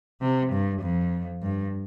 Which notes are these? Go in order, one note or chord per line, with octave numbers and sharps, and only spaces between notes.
C3
G2
F2
G2